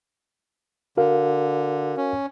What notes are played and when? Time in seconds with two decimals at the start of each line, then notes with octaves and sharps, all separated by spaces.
0.97 D3 F#4 A#4 F5
1.97 C#4